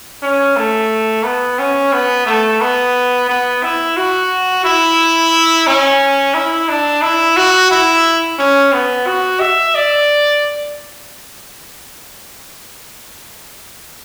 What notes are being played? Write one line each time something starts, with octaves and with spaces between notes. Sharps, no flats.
C#4
A3
B3
C#4
B3
A3
B3
B3
E4
F#4
E4
C#4
E4
D4
E4
F#4
E4
C#4
B3
F#4
E5
D5